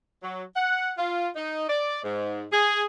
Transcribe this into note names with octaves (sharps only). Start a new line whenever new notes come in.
F#3
F#5
F4
D#4
D5
G#2
G#4